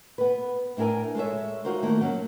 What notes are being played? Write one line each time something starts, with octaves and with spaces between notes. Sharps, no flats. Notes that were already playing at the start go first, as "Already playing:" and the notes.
B3 B4
A2 D4 E4 A#4 G#5
G#3 A4 C#5 E5
D#4 F4 F#4 A#4 C5
D#3 A3 A#3 F#4
F#3 C#4 F#4